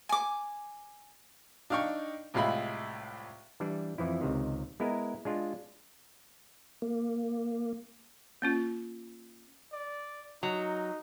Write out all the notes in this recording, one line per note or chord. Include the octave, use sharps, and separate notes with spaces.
G#5 D6
D4 D#4 F5 G5 C#6
C2 A2 G#3 F4 E5 B5
E3 G3 D4
F2 E3 F3 E4
C#2 C3 D#3
G#3 B3 E4 A#4 D#5
G#3 D4 F4
A#3
A#3 C#4 F4
D5
F#3 D#4